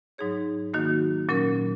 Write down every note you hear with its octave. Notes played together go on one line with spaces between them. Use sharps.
G#2 F#3 D#4 G#4 C#5
D#3 F#3 A#3 D#4 F#4
A#2 F#3 C#4 A#4